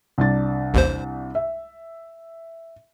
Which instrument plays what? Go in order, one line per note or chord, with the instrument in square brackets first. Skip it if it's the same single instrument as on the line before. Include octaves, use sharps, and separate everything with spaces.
[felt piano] C2 D4 A6
[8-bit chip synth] A1 D#2 C5
[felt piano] E5